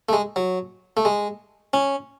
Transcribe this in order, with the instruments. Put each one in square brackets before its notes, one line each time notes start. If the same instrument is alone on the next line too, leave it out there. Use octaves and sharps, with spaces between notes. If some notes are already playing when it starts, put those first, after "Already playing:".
[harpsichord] A3
G#3
F#3
A3
G#3
C#4